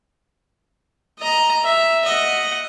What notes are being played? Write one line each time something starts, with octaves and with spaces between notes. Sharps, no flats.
D#5 A#5
E5
D#5 F#5